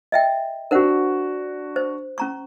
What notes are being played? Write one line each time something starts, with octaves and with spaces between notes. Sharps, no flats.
D#5 E5 G5
D4 F#4 A#4 C5 F#5
C5
C#4 A#5 C#6